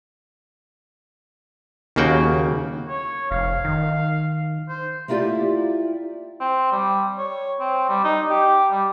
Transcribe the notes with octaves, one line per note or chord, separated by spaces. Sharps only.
D#2 C#3 A#3 F#4 G5
C#5
F1 F5
D#3
C5
A3 A#3 E4 F4 G4 D5
C4
G3
C#5
C4
G3
D#4
G4
G3